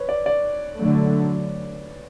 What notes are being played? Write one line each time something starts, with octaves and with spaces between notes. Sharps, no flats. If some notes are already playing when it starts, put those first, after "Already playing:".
Already playing: B4 C#5
D5
D5
D3 F#3 A3